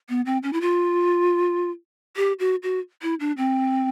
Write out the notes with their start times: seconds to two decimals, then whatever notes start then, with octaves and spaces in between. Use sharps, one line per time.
0.09 B3
0.26 C4
0.43 C#4
0.53 E4
0.61 F4
2.17 G4
2.39 F#4
2.63 F#4
3.02 E4
3.20 D4
3.37 C4